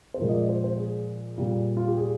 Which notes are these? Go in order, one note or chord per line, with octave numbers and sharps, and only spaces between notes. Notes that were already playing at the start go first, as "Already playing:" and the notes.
C5
A#2 F3 G#3 A#4
D#5
D5
C5
C5
G#4
A#2 G3 A#3
F4
G4
G#4